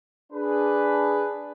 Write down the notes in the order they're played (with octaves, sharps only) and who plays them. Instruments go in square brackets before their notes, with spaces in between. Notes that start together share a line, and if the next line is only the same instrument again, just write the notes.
[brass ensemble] D4 G#4 B4